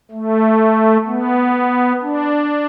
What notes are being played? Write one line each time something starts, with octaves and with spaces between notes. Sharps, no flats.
A3
B3
D4